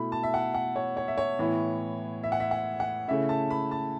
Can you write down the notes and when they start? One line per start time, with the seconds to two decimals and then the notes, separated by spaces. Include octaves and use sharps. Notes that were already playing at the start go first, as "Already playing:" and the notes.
Already playing: B2 A3 E4 B5
0.12 A5
0.23 E5
0.34 F#5
0.54 F#5
0.76 C#5
0.97 C#5
1.08 E5
1.18 C#5
1.39 A2 E3 B3 E4
2.23 E5
2.32 F#5
2.40 E5
2.51 F#5
2.80 F#5
3.08 C#3 A3 C#4 E4 E5
3.29 A5
3.51 B5
3.71 A5